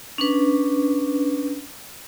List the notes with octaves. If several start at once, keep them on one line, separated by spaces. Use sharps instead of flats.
C#4 D4 B4